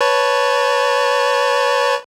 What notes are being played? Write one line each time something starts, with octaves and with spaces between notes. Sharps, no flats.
B4 C#5 A5